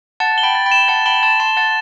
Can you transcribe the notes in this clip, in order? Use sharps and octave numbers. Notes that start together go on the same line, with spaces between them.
F#5 A5 A6
G7
G5 B5
A6
G5 B5
E7
F#5 A5 A6
G5 B5 G7
A5 C6 A6
A5 C6 E7
F#5 A5 A6